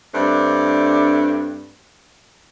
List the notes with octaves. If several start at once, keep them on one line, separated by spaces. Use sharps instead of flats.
G2 A3 C4 D4